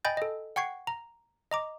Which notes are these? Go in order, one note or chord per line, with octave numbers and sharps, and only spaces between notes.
D#5 G5 G#5 B5 G6 A6
A4 D#5
F#5 G5 C#6 G#6 C7
A#5
D#5 A#5 D6